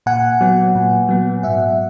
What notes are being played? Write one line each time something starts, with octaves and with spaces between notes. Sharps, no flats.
A#2 F#5 G#5
F#3 B3
A#2
F#3 B3
G#2 E5 F#5